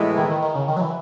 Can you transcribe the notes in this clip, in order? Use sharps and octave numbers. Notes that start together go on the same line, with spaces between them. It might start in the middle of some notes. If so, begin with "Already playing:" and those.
Already playing: A2 E3 G#3 B3 E4
D#3
D#3
D#3
C#3
D#3
F#3
E3